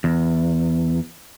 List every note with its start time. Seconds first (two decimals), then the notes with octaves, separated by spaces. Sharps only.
0.04 E2